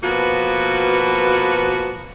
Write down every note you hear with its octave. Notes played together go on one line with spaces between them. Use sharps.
B2 F3 A#3 F#4 B4